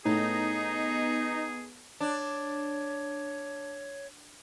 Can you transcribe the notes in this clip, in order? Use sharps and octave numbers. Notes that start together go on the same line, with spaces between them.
A2 B3 D#4 G#4
D4 C#5